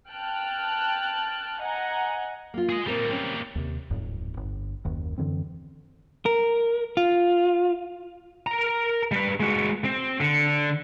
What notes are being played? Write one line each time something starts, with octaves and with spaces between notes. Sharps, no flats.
G5 A5 F6 F#6
D#5 F#5 G#5 A#5
A#3 F4
G#4 D#5
A#2 G3 A#3 C4 A#4
C4 C#4
D#2 C3
D1 F2 G#2
G1
F#1 D#2 D#3
F#2 D3 E3 C4
A#4
F4
A#4 A#5
G3 B4
G#3 F#4
C4
D3